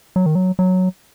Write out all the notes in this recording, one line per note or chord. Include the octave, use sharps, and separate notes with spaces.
F#3
D#3
F#3
F#3